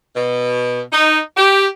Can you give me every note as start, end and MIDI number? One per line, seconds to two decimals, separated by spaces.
0.16 0.82 47
0.92 1.20 63
1.37 1.67 67